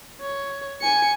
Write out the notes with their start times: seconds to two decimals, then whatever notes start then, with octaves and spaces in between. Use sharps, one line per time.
0.22 C#5
0.82 G#5 C#7